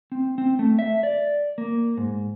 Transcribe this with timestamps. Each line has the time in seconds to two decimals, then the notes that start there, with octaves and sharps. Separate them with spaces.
0.12 C4
0.38 C4
0.59 A3
0.79 E5
1.03 D5
1.58 A#3
1.97 G#2